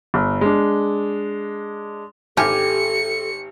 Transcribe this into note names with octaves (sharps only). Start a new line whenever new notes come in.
G1
G#3 D4
G#1 G4 A4 G#5 F6 C#7